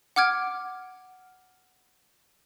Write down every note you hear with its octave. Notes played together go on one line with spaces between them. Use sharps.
F#5 D6 F6 G#6 D7